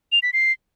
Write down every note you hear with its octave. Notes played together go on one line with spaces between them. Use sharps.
F7
B6
C7